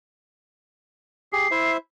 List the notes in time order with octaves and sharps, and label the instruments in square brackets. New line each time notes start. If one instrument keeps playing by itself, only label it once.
[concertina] G4 G#4 [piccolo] C7
[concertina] E4 C5 E5